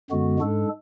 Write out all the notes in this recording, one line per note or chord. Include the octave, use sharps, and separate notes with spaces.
F#2 D3 G#3 B3 F#4
G#2 G#3 D4 A4